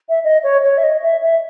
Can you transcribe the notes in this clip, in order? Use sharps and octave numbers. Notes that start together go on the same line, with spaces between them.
E5
D#5
C#5
C#5
E5
D#5
E5
E5